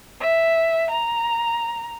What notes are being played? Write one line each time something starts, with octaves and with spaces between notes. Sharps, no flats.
E5
A#5